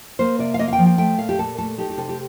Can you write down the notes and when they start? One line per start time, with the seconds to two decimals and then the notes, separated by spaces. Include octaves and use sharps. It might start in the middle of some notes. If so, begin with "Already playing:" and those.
0.19 A#3 C5
0.39 C3 D5
0.54 F5
0.59 A#3 D#5
0.68 F5
0.73 G5
0.78 F3
0.86 G5
0.98 A3 G5
1.18 A#2 F5
1.29 G4
1.38 A#2 A4
1.58 A3 A4
1.78 D#4 G4
1.90 G4
1.97 C3 A4
2.09 G4